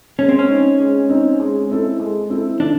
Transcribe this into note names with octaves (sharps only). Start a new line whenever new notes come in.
G#3 C#4
C4
C#4
C4 D#4
G#3
C4 D#4
G#3
C4 E4 A4
G#3
C4 E4 A4
D#3 D4